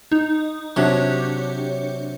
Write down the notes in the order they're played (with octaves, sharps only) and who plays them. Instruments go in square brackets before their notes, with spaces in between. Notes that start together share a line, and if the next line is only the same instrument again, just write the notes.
[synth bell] D#4
[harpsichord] C3 F#3 [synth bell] D4 G4 C#5